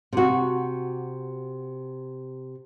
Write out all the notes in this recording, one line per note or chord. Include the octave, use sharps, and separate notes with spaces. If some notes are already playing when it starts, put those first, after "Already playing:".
C3 F#4